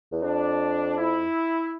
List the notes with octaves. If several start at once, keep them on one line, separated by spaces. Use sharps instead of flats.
E2
F2 D4
E4